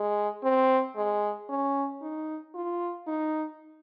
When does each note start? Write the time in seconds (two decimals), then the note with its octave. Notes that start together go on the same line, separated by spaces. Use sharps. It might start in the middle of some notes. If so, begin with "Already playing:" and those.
Already playing: G#3
0.44 C4
0.96 G#3
1.49 C#4
2.02 D#4
2.55 F4
3.07 D#4